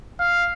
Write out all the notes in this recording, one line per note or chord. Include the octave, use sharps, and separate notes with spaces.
F5